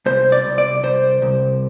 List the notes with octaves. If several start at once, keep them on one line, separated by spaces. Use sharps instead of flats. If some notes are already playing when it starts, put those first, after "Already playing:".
C2 C5
D5
C2
D5
C2 C5
C2